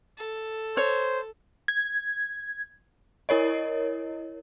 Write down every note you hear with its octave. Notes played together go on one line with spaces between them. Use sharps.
A4
C5 C#5
G#6
E4 A#4 C#5 D#5